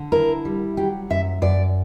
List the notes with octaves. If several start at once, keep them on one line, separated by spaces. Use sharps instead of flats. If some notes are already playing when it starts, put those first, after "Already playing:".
Already playing: D3
E4 A#4
G3
F#3 G4
F#2 E5
F#2 D5